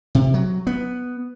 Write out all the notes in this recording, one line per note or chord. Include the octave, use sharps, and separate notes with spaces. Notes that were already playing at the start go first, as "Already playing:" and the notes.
C3
F#3
B3